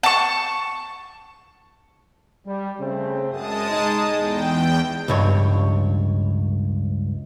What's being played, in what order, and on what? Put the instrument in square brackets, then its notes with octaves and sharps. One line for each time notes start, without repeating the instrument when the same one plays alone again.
[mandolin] A5 C#6
[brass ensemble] G3
C#3 A3 C4
[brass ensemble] F#2 [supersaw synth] G#3 A5 D#6
[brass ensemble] B1 D#4
[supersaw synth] E2 G5
[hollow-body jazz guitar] C#2 G2 C#5